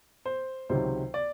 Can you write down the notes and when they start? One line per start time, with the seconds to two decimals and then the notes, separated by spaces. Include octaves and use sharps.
0.25 C5
0.69 C#2 C3 D#3 F#3 C5
1.14 D5